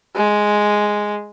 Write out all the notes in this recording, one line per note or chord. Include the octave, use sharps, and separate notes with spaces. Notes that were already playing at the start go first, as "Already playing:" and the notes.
G#3